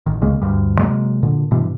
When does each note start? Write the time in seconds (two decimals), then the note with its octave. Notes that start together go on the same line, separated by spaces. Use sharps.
0.06 A1 D#3
0.22 C#2 C#3 G#3 A#3
0.42 D2 G2 G3
0.78 C3 F#3 G#3 A#3
1.23 A#2 D3
1.51 G2 B2 E3